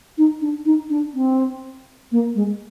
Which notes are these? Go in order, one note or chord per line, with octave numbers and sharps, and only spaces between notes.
D#4
D4
D#4
D4
C4
A#3
G#3